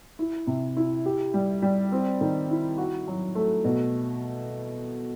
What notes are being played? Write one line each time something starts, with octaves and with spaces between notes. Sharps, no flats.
E4
C3
E4
G4
G3
G3
C4
D#3
E4
F#4
F#3
A3
B2